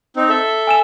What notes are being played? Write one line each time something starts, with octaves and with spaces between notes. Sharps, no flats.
C4 D#4
A4 E5
G#5 E6 E7